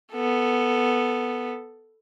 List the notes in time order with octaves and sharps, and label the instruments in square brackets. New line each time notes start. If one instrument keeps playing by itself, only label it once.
[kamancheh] B3 A4